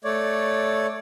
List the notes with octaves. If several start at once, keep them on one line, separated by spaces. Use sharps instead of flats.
A3 C#5 D5